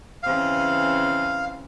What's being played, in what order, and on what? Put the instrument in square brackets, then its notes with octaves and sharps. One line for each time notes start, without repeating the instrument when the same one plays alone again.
[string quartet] C#3 E3 C4 [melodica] F5